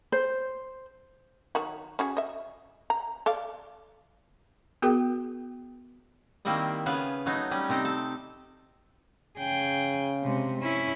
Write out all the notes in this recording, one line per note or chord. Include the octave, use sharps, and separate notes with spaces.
C5
D#3 F#3 F#4
C#4 F#4 G#4
D#5 E5
A#5
A4 D5 F5
B3 F#4 G#4 A#4 G5
D#3 G3 A#3 C4 E4 D#5
C#3 B3 B4 F5 G#5
F#3 A3 B3 D#4
G3 C#4
C3 C4 D#4 D#5
A4
C#3 G#4 G5
C3 G#3
C#4 E4